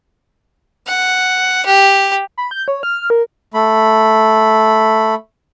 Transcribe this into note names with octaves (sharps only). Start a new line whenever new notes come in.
F#5
G4
B5
G6
C#5
F6
A#4
A3 B5